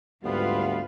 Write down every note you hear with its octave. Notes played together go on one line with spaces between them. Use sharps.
D2 G#2 G3 B3 C4 F4 B4 F5